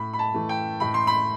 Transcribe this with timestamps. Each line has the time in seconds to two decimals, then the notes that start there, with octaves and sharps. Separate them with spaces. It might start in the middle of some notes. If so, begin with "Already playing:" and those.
Already playing: A2 B5
0.13 B5
0.19 A5
0.34 E3 A3
0.49 G5
0.80 A2 B5
0.94 C6
1.07 B5